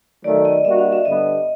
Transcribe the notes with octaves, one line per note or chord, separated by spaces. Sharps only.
D#3 F#3 A3 D5
D#5
G3 A#3 D4 F#4 E5
F5
E5
G2 D3 G3 B3 D4 D#5